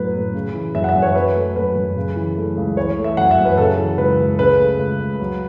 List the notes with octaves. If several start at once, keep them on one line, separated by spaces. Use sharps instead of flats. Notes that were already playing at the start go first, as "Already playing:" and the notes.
Already playing: F#2 A2 F#3 A3 B4
A2
C#3
E3
F#2 E5
F#5
E5
F#2
C#5
F#3 B4
A3
F#2 B4
F#2
C#3
E3
A3
C#2
E3 C#5
A3
E5
F#2 F#5
E5
F#2
B4
C#3 A4
E3
C#2 B4
C#2
C#3 B4
A3
C#2
C#2
F#3